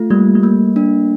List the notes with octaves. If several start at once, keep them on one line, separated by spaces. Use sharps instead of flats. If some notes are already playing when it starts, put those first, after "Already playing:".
Already playing: A3 F4
G3 A#3
G3
A#3
D4